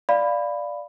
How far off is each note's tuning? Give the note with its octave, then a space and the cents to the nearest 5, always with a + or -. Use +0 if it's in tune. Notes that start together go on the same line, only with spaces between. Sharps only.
D5 +0 F5 +0 B5 +5